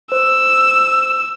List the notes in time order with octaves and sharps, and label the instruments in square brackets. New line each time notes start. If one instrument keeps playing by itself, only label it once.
[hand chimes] C5 [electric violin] E6